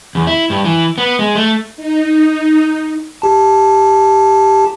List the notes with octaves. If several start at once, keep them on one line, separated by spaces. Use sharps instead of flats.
E2
E4
G2
E3
B3
G#3
A3
D#4
G4 A5